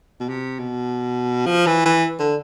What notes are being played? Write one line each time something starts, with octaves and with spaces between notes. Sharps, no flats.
B2
C3
B2
F3
E3
E3
D3